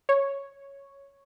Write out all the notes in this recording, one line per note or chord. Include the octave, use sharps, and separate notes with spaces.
C#5